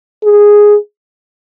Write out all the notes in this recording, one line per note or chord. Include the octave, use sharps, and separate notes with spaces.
G#4